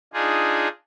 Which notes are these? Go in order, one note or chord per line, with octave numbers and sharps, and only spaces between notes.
D4 D#4 F4 G#4